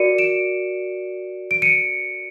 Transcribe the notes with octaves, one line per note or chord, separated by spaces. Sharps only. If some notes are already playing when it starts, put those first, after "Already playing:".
Already playing: F#4 A#4 D5 C#7 D#7
D7 E7
D7
C#7 D#7